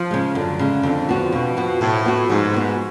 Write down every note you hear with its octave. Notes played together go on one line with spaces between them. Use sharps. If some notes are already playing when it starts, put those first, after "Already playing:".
Already playing: F3
C#3 G#3
F#2 D3
C#3 G#3
F2 D3
F3 B3 F#4
F2 B2
F3 B3 F#4
A2 F3
B3 F#4
G#2 F3
B3 F#4